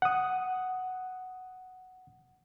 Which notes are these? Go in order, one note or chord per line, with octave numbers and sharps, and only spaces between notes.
F#5 D#6